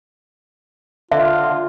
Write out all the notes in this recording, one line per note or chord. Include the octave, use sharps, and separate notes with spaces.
D3 F4 E5